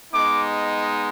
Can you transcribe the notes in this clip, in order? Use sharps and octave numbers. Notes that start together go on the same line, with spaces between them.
G#3 B3 D#4 D6